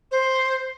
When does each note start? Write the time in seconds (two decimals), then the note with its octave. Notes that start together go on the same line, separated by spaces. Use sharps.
0.11 C5